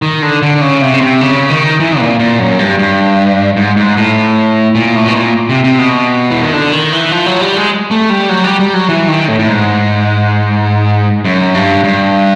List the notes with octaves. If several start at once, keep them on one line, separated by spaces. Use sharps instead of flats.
D#3
D3
D3
C#3
C3
C#3
C3
C#3
D#3
E3
A#2
A#2
F#2
G2
G2
G#2
G#2
A2
A#2
A2
B2
A#2
C3
C3
B2
E3
D#3
D3
D#3
E3
F3
F#3
G3
G#3
A3
G3
F#3
G3
G3
F#3
E3
D#3
A2
A2
G#2
F#2
G2
G2